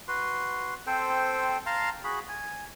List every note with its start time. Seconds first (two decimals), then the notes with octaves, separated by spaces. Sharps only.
0.08 F#4 B4 C6
0.87 C4 A4 C5 G5
1.66 F5 A5 A#5 C6
2.04 F#4 G#4 B5
2.29 G#5